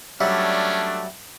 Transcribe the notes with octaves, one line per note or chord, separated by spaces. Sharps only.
F#3 G3 A3 C#4 D4 E5